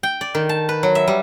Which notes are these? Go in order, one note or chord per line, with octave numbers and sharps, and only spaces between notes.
G5
D5
D#3
A5
B4
F#3
E5
G3